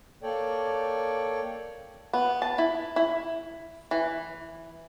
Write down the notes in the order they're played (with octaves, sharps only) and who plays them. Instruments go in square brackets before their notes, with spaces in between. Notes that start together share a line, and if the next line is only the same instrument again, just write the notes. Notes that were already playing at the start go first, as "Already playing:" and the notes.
[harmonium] A#3 A4 C#5 D5 G5
[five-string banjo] B3
A5
E4
E4
E3